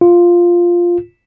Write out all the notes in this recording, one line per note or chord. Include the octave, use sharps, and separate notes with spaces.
F4